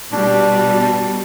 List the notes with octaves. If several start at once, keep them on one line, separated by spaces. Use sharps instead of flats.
B2 G3 D4